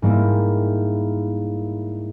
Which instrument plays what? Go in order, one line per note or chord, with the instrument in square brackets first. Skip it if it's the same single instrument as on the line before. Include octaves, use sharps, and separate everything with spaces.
[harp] G#2 G3 A#3 E4